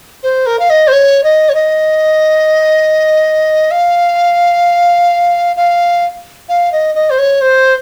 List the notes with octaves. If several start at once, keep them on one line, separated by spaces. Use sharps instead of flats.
C5
A#4
F5
D#5
C5
C#5
D#5
C#5
D#5
F5
F5
F5
D#5
D#5
C5
C#5
C5